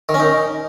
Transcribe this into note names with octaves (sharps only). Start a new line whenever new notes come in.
D#3
C#4
D#4